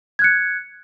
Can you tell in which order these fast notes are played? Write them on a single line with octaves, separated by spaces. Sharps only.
G#6 F#6 C#7